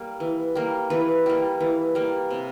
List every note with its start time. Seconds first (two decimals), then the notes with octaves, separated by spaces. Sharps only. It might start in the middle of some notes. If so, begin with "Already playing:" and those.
Already playing: G3 A#3
0.20 E3
0.55 G3 A#3
0.90 E3 B4
1.26 G3 A#3
1.60 E3
1.95 G3 A#3
2.31 C3